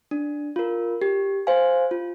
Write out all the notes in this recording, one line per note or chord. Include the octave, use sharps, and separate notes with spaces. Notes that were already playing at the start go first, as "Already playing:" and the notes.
D4
F4 A#4
G4
C5 F5 G#5
F4